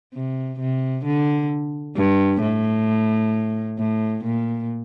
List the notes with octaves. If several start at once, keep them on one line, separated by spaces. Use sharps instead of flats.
C3
C3
D3
G2
A2
A2
A#2